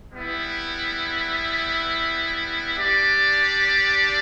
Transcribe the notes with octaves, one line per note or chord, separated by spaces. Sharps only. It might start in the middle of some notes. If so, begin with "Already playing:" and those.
G3 B3 E4
G3 D4 G4 D5